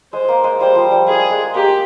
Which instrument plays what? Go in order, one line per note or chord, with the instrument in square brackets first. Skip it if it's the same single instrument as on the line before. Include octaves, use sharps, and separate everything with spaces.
[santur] G#3 [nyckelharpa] C5
[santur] A#3
G#3
[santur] G3 [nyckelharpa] C5
[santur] F3
G3
[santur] G#3 [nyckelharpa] G#4
[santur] G#3
[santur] A#3 [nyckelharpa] G4